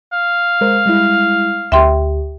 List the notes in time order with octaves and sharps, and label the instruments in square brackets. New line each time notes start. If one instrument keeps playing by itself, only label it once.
[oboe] F5
[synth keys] G#3 A#4 C5
G3 G#3 E4
[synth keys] D2 G4 [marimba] E5 G5 C6